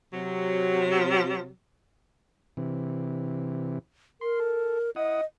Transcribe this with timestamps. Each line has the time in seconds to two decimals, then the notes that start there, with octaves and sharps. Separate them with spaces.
0.13 C3 F#3
2.57 C3 E3
4.21 A#4 C6
4.39 A4
4.96 E4 D#5 F#5 D#6